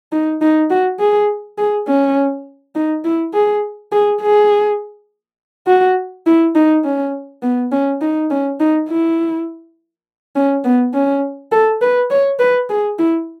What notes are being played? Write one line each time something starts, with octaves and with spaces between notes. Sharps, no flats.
D#4
D#4
F#4
G#4
G#4
C#4
D#4
E4
G#4
G#4
G#4
F#4
E4
D#4
C#4
B3
C#4
D#4
C#4
D#4
E4
C#4
B3
C#4
A4
B4
C#5
B4
G#4
E4